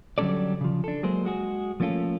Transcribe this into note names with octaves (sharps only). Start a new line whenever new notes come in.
D3 F#3 G3 C#4 A4 D5
C#3 F3
D4 A4
F#3 G#3 A#3 G#4 C5
G#3 F#4 G#4
F3 A3 A#3 C#4 F4 A4